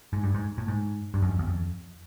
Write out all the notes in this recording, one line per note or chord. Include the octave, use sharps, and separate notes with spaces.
G#2
G2
G#2
A2
G#2
G2
F#2
F2
E2
F2